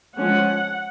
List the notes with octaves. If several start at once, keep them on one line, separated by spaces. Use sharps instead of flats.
F3 G#3 C#4 F#5